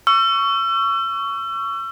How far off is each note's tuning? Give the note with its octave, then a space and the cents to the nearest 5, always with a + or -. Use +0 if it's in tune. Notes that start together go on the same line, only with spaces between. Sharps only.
C#6 +15 E6 +40